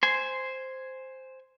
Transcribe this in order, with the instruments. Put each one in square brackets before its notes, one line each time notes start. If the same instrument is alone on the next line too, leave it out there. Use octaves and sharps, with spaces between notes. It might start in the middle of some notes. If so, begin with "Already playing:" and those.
[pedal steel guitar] C5 G#5